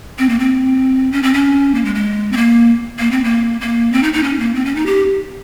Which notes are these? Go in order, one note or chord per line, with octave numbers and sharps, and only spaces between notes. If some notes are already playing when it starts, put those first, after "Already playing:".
C4
A#3
C4
C#4
C4
C#4
A#3
G#3
G#3
C4
A#3
A#3
C4
A#3
A#3
C4
D#4
D#4
C#4
A#3
C4
C#4
D#4
G4